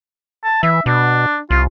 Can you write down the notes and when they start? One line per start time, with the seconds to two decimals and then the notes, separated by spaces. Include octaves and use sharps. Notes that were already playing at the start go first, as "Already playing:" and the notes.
0.44 A5
0.63 E3 E5
0.86 B2 D4
1.51 C2 F4